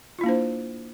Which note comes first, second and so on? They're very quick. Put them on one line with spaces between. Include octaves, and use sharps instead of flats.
F4 E4 A#3 D4 C5